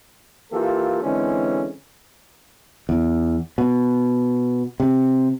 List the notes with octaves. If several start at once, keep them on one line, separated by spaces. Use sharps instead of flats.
E3 A#3 F4 G4 A4
D3 E3 G#3 C4 C#4
E2
B2
C3